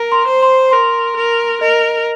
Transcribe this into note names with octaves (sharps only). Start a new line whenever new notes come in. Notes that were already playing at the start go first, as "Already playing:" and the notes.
Already playing: A#4 A#5
C6
C5
C6
A#4 C6
A#4
A#4 D#5